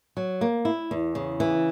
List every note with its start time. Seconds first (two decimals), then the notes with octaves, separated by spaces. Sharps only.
0.17 F#3
0.41 A#3
0.65 E4
0.91 E2
1.15 C#3
1.40 E3